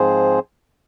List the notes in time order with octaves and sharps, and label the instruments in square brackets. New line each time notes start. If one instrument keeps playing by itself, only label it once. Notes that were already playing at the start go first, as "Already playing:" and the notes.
Already playing: [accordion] G#2 F3 C4 G#4 C5